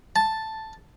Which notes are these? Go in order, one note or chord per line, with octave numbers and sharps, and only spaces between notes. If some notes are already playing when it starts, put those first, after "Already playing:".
A5